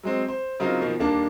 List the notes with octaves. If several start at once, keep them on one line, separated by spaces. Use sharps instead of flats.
F#3 G#3 C4
C5
C#3 F#3 C4 D#4 F4 A#4
B2 D#3 F3
D#1 D#3 A#3 D4 A5